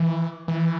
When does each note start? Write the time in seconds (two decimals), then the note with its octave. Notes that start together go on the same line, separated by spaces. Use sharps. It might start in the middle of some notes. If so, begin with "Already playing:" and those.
Already playing: E3
0.48 E3